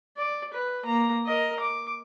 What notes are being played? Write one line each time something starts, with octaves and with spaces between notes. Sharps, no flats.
D5
B4
A#3 A#5
A#4 D#5
D6